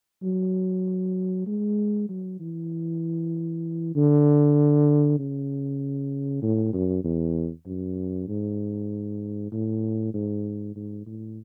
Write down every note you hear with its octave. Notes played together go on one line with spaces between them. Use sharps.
F#3
G#3
F#3
E3
D3
C#3
A2
F#2
E2
F#2
G#2
A2
G#2
G#2
A2